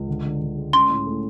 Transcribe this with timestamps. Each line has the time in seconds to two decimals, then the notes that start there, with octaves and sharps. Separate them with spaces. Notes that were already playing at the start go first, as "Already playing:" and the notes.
Already playing: C#2
0.08 D3
0.24 D3
0.41 D3
0.57 G#3
0.73 C#4 C6
0.90 A2
1.06 A3